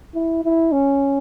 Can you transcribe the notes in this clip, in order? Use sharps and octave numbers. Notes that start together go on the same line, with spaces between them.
E4
E4
C#4